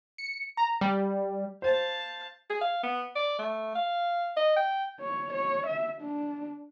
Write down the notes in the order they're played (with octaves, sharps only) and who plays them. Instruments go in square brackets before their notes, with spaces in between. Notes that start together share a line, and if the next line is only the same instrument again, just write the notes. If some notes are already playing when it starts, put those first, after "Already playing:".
[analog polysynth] C#7
A#5
G3
[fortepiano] C5 [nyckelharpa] F5 A5
[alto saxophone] G#4
F5
B3
D5
A3
F5
D#5
G5
[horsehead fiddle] C#5
C#5
E5
D4